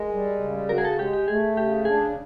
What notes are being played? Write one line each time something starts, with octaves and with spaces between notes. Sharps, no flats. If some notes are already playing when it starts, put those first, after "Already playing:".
Already playing: G#3 A#4
G3
C#3
F#4 A#4
G#4
A4
G#3 G4
G4
A3 G#4
C#3 G4
D4 G#4